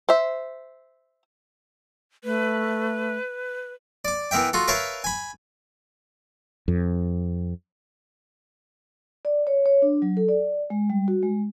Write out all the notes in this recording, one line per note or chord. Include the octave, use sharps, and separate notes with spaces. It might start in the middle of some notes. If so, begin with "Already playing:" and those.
C5 E5
A3 B4
D5 D6
E3 B3 A#4 E5 G5
F4 F#4 A4
A#4 B4 C#5 E5 F5 A5
G#5 B5
F2
D5
C#5
C#5
D4
F#3
A4
D5
G#3
G3
F#4
G#3